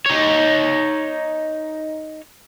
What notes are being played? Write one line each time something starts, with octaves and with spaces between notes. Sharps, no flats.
D#4 C#5